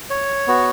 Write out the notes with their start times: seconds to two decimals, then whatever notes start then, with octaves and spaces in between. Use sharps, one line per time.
0.10 C#5
0.47 B3 F#4